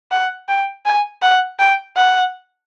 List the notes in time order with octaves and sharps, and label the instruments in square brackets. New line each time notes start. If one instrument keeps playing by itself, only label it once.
[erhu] F#5
G5
G#5
F#5
G5
F#5